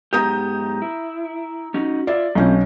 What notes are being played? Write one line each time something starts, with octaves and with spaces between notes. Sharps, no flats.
G#2 B3 G4 A#5 D#6 G6
E4
C#4 D#4 F#4
F4 D5 E5
B1 A3 C4 C#4